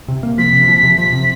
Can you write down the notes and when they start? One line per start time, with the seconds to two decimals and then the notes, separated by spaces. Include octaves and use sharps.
0.08 C3
0.23 A#3
0.38 F3 B6
0.53 C3
0.68 F3
0.83 C3
0.98 F3 B6
1.13 C3